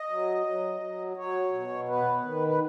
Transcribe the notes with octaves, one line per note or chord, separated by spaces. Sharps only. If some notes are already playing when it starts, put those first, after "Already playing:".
Already playing: D#5
F#3
F#3
F#3
F#3 C#5
B2
B3 B4
D#3
B4